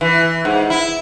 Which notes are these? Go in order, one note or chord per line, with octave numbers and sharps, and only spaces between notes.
E3
G#2
E4